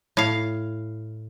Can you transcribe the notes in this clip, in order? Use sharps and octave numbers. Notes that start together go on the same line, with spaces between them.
A2 F5